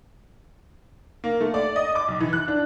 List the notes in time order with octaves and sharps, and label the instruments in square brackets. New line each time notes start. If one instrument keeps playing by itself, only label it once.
[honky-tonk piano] A#3
A3
D5
D#5
D6
B1
E3
F#6
D4